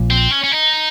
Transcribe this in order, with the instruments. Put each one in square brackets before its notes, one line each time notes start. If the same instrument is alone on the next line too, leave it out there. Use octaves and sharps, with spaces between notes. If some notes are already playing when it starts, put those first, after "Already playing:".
Already playing: [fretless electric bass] A#1 A#2 F3
[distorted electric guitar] C4
C#4
C#4
D#4